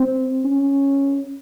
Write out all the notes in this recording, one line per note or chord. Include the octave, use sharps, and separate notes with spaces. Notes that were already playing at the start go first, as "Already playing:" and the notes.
Already playing: C4
C#4